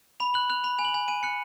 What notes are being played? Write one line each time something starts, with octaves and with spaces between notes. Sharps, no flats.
B5 F7
F#6 F#7
F#6 F7
B5 F7
G#5 F7
F#7
F7
G#5
G#5 D#7
F#6 C#7